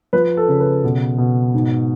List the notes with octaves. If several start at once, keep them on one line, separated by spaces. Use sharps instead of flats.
F3 B4
A4
C#3
B4
B2
B2
G#2